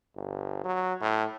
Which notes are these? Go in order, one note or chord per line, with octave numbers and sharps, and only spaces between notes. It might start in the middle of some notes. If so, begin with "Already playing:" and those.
G1
F#3
A2